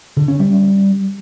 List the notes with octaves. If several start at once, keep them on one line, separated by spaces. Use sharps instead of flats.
D3
C#4
G3